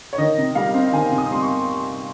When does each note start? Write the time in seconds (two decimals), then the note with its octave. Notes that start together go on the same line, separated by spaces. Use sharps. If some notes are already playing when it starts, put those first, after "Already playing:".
0.13 C#5
0.18 D#3 D#5
0.38 C3
0.55 G3 F5
0.74 C4
0.92 D#3 G#5
1.12 C3
1.18 D#6
1.31 G3 C6
1.42 C#6